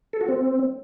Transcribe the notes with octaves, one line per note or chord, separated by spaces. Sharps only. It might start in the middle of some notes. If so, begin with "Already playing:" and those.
A4
F#4
C4